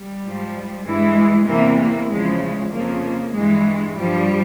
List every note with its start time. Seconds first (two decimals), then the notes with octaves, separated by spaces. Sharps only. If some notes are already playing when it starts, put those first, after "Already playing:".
Already playing: G3
0.24 G#2 F3
0.86 G2 E3 G#3
1.48 E2 C3 E3 A#3
1.79 A#3
2.10 E2 C#3 F3 G#3
2.42 G#3
2.72 F2 C#3 F3 A#3
3.04 A#3
3.35 G2 E3 G#3
3.97 G2 F3 G3